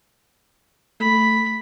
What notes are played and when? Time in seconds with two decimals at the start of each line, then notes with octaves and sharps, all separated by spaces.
1.00 A3 B5